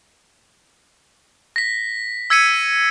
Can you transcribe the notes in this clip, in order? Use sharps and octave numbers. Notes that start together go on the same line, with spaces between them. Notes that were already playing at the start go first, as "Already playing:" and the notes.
A#6 B6
E6 G#6 B6 C#7 D#7